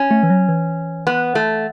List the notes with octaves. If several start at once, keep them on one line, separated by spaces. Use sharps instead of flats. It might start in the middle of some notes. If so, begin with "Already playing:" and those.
Already playing: C#4
A3
E3
F#3
E3
B3
A3